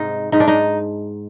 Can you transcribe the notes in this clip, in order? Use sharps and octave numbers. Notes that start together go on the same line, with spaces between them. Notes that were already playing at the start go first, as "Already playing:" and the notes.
Already playing: G#2 C3 D#4
G#2 D#4
D4
D#4